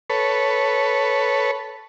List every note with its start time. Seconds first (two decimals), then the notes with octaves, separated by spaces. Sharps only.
0.10 A4 B4 C#5